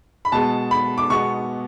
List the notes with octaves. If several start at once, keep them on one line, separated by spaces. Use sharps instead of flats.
B5
B2 G#3 B3 A5
B5
D6
B2 G#3 B3 C#6